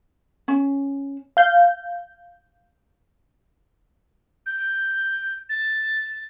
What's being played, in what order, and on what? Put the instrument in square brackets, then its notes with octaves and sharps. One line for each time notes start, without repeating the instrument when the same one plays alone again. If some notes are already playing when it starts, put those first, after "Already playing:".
[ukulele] C#4
[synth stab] F5 G6
[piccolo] G6
A6